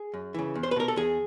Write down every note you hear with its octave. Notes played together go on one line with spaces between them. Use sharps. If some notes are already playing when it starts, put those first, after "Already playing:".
Already playing: G#4
F#2
C#3 E3
E2
C5
B4
B2 A#4
A4
E2 G#4